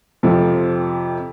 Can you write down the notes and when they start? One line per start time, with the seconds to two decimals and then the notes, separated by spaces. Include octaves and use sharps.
0.23 F2 C3 F3